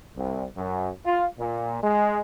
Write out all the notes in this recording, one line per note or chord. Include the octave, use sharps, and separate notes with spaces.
C2
F#2
F4
A#2
G#3